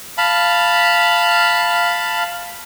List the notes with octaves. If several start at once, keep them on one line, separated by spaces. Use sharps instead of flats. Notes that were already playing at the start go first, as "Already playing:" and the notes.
F5 A5 B5